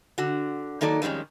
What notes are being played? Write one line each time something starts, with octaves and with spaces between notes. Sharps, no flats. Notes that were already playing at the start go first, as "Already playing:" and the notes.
D3 F#4
D#3 F#3 A#3 D#4 A4 D5
F2 D#3 G3 G#3 C#4